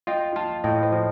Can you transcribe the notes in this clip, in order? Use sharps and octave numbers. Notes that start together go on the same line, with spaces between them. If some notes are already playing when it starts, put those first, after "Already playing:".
F4 D#5 G5
F4 F5 A5
A2 D#5 G5
C5 D#5
F3